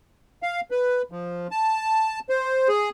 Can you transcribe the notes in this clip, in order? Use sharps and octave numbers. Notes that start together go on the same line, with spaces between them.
F5
B4
F3
A5
C5
G#4